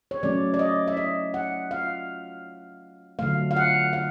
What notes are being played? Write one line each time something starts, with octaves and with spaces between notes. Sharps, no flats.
C#5
F#3 A3 C#4 D5
D5
D#5
E5
D#5
F#5
F5
D3 F#3 A3 F5
F5
F#5
F5